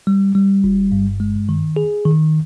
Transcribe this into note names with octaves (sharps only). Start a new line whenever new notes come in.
G3
G3
G1
G2
G#3
D#3
G#4
D#3